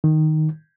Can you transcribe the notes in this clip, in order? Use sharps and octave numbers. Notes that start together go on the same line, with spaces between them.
D#3